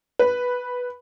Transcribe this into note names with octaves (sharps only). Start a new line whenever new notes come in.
B4